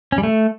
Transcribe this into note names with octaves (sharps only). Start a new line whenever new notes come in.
C#4
G3
A3